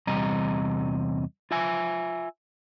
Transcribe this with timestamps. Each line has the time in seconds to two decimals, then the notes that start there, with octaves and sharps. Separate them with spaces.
0.07 E2 C3 G3 D#5 A#5
1.51 F4 E5 G#5